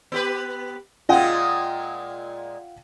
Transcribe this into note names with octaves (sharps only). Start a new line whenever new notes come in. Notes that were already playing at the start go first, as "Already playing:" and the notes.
B3 G4 B4
A#2 G#3 F4 D#5 F#5 G5